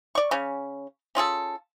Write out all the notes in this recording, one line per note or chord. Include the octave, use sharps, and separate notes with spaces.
D5 C#6
C#3 C#4
C#4 F4 G#4 A4